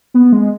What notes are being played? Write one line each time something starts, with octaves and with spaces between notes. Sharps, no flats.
B3
G#3